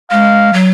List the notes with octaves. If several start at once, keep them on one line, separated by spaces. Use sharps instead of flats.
G#3 F5
F#3